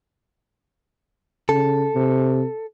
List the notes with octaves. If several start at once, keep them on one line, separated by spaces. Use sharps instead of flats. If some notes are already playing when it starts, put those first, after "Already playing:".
C#3 A4
C3